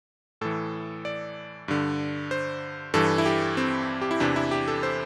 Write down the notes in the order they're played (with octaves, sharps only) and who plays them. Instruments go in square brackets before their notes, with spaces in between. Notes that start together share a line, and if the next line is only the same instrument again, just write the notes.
[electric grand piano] A2 E3 A4
D5
G2 D3
C5
G2 E3 A4
E4
G4
C4
G4
E4
E2 C3 E3 D4
E4
G4
A4
C5